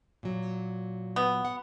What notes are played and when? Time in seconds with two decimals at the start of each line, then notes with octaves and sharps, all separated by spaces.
0.23 A#2 F#3
1.16 B3
1.45 F#5